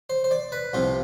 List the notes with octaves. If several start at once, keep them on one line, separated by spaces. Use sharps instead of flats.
C5
C5
D5
B4
C2 C3 F3 F4